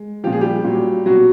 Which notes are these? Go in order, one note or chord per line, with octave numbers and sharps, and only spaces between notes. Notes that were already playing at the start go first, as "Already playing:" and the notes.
Already playing: G#3
A#2 F3 G4
G#4
G3 G4
A#2 F#3
B2 F#3 F#4